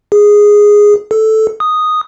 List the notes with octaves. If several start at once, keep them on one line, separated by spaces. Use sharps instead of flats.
G#4
A4
D#6